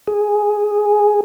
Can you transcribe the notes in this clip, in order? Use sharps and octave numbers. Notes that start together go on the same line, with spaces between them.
G#4